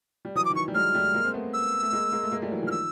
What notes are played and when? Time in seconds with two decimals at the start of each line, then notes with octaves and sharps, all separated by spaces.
0.25 G3
0.35 E3 F#3 D#6
0.45 D6
0.50 D#3
0.55 E3 C#6
0.68 G3
0.74 F#3 G#3 F6
0.94 G3 A3
1.14 G#3 A#3
1.24 C4
1.34 A3 B3
1.53 E6
1.83 A3
1.93 G#3 A#3
2.12 G#3 A#3
2.23 A3
2.32 G#3 A#3
2.42 G3 A3
2.52 E3 F#3
2.62 D#3 F3
2.67 F6
2.71 E6